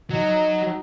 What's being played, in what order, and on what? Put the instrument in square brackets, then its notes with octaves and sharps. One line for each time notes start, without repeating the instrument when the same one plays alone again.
[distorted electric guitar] F#3 [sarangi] D#4